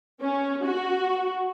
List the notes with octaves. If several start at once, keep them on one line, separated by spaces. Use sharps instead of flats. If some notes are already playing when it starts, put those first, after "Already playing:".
C#4
F#4